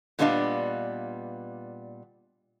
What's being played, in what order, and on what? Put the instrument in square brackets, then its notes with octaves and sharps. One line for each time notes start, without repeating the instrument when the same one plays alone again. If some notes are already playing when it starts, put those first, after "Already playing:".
[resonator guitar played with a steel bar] A#2 G3 B3 D4 D#5 F5